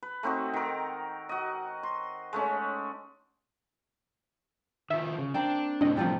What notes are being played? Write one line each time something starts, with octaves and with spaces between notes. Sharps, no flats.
B4
A3 C4 D#4 F#4
D#3 A#4
F#4 D#5
C6
G#3 A3 C#4
D#3 F3 E5
C#3
A#3 C4 D4 G5
F#2 A2 C3 G3 D4 D#5
C3 F3 G3